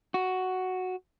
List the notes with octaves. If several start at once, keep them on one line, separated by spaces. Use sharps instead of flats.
F#4